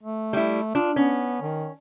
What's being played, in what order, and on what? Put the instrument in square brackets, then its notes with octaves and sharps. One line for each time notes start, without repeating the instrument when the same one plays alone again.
[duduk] A3
[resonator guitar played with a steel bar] G3 E4
[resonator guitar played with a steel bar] D4 [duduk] F4
[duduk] B3 [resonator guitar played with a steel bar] C#4
[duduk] D#3